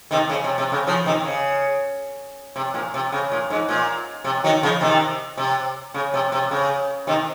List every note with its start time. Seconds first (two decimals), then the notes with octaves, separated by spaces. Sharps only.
0.11 C3 D#3
0.30 C#3
0.44 C3
0.58 C3
0.72 C#3
0.87 C#3 F3
1.06 C3 D#3
1.25 C#3
2.56 C3
2.74 A#2
2.94 C3
3.12 C#3
3.32 A#2
3.50 G#2
3.69 A#2
4.24 C3
4.44 D#3 F#3
4.63 C#3 F3
4.81 C3 D#3
5.37 C3
5.94 C#3
6.14 C3
6.32 C3
6.51 C#3
7.07 C3 D#3